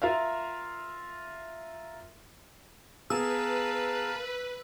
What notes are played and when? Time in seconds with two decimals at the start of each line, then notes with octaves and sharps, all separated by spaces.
0.02 F4 A#4 E5 F5
3.10 B3 G#4 A#4 B4 F5 A5 E6